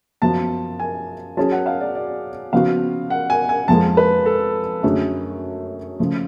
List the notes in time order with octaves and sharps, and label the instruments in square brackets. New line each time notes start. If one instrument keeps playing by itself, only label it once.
[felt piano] F#2 F3 B3 F#4 [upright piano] A5
[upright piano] G#5
[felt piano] F#3 C#4 G#4 [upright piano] A5
[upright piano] F#5
F5
D5
D5
[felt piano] C#3 F3 B3 F#4 [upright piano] F5
[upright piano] F#5
G#5
G#5
[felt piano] F2 F3 G#3 [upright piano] A5
[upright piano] B4
A4
[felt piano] F#2 D3 F#3 A3 C#4 [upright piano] G#4
[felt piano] C#3 F3 A3